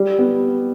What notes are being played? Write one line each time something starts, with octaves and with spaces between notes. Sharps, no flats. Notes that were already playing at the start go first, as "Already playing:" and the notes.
Already playing: G3
B3